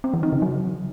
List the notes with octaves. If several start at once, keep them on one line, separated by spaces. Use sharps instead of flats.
C4
E3
D#4
C#3
F#3